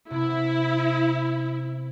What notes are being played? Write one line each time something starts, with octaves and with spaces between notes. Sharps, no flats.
C3 B3 E4